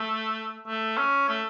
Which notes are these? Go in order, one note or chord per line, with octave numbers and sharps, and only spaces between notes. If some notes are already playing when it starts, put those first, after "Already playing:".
Already playing: A3
A3
C#4
A3